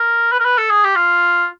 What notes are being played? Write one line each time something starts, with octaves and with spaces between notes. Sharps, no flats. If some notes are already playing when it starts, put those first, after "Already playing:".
Already playing: A#4
B4
A#4
B4
A4
G#4
G4
F4